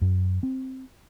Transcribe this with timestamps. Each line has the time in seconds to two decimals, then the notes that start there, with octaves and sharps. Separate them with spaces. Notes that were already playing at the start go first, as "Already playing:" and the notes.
0.01 F#2
0.43 C4